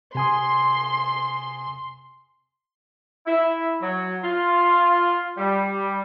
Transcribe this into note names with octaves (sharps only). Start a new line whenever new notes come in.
C3 G#5 C6 D#6
E4
F#3
F4
G3